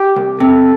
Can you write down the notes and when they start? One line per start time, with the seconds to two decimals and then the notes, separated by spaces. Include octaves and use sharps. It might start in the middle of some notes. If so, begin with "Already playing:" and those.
Already playing: G4
0.16 C2
0.40 C3 A4